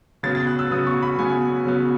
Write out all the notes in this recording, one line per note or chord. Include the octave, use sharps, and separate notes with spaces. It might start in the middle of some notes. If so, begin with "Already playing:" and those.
C#3 F#3 B3 A6
A6
F#6
E6
C#3 F#3 B3 D#6
C#6
B5
C#3 F#3 B3 G#5
C#3 F#3 B3